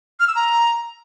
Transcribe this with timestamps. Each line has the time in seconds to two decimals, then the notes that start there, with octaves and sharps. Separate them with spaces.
0.20 F6
0.28 E6
0.35 A#5